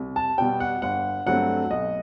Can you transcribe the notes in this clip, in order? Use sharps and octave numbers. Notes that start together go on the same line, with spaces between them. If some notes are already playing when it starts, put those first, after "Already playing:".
Already playing: C2
A5
B2 G3 G5
F#5
G1 F#5
G2 F#3 A3 C4 F#5
B1 D#5